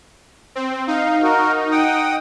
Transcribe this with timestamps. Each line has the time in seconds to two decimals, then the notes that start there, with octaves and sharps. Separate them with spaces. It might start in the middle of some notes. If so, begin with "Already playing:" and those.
0.55 C4
0.87 D#4 F5
1.22 F#4 A#4
1.71 F#5 G5 D#6